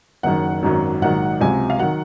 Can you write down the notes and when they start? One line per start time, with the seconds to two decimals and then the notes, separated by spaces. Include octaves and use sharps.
0.23 F#1 F#2 D#3 F#5
0.63 G#1 F#2 D#3 F#3
1.01 A#1 G#2 D#3 F#3 F#5
1.41 C#2 C3 F#3 G#5
1.70 F5
1.80 D#3 F#3 F#5